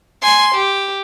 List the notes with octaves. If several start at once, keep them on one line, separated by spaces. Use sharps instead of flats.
G#5 C6
G4